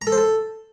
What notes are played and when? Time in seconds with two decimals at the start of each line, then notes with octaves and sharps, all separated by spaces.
0.02 A#5
0.07 A4
0.12 C5
0.18 A4